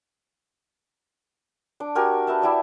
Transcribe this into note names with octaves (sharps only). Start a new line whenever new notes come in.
D4 D6
F#4 G4 A#4 G#5
B4 D#5 E5 A5
E4 G4 D5